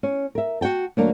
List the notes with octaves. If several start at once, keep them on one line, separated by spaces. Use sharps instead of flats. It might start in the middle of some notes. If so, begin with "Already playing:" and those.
C#4
A#4 E5
F#4 F#5 G5 A5
D2 F#3 A#3 D4 A#4